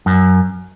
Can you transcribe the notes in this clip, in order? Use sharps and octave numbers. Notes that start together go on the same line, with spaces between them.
F#2